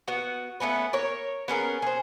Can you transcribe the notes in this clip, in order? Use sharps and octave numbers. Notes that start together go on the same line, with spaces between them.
B3 F#4
A3 B3 C#4 B4
A#4 C#5
B3 C#4 G#4 A#4
G#4 C5